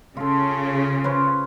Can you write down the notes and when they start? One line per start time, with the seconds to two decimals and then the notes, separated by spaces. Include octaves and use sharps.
0.17 C#3 F4 A4
1.04 C#4 B4 C5